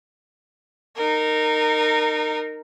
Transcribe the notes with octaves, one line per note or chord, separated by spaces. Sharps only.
D#4 A#4